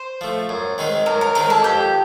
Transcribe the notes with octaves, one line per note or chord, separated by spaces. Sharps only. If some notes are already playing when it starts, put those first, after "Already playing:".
Already playing: C5
F3 A3
F#2
D#3 G#3 C4 D#4
F#2 A#4
A#4
D#3 G#3 C4 D#4 A#4
A4
F2 G4